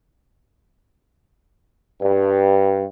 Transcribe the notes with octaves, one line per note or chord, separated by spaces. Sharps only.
G2